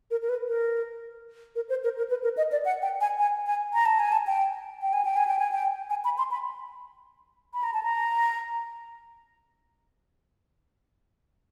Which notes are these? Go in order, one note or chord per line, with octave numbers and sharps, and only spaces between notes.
A#4
A#4
B4
A#4
A#4
C5
A#4
A#4
B4
A#4
D#5
D5
F#5
G5
G#5
G#5
G#5
A#5
A5
G#5
A5
G5
G5
G#5
G5
G#5
G5
G#5
G5
G#5
B5
C6
B5
B5
A#5
A5
A#5